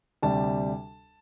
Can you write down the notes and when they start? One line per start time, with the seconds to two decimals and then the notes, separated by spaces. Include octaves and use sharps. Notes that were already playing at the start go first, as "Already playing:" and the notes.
0.23 D2 C3 G3 D4 A5